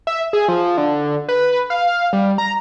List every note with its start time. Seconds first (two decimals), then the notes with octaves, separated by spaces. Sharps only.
0.07 E5
0.33 G#4
0.48 F3
0.78 D3
1.28 B4
1.70 F5
2.13 G3
2.38 A#5